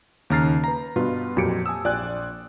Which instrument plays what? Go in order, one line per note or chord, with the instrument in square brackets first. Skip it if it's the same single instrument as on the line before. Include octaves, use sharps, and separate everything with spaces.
[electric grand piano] D#2 C#3 A#5 F6 A6 C7
B4 A#5
G2 B2 F4 B4
F2 A#2 F#3 G4 C#7 D7
G#5 A5 D#6 E6
A#1 F4 D5 G5 G#5 F#6